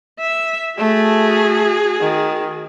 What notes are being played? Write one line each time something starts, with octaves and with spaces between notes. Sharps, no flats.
E5
A3 F#4 G#4
D#3